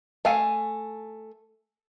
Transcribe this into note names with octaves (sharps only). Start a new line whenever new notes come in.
A3 F5 G#5